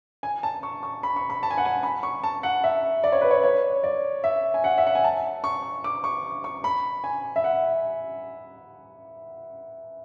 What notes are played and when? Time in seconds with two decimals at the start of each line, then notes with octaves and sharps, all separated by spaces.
0.23 G#5
0.43 A5
0.63 C#6
0.83 C#6
1.03 B5
1.16 C#6
1.30 B5
1.43 A5
1.51 G#5
1.58 F#5
1.65 G#5
1.83 B5
2.03 C#6
2.24 A5
2.43 F#5
2.64 E5
3.04 D5
3.12 C#5
3.21 B4
3.31 C#5
3.44 C#5
3.84 D5
4.24 E5
4.54 G#5
4.64 F#5
4.78 E5
4.87 F#5
4.95 G#5
5.04 A5
5.44 C#6
5.84 D6
6.04 C#6
6.44 C#6
6.64 B5
7.04 G#5
7.36 E5
7.44 F#5